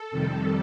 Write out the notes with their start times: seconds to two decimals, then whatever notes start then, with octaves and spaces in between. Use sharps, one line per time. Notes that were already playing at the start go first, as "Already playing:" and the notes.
Already playing: A4
0.11 F2 C3 D#3 G3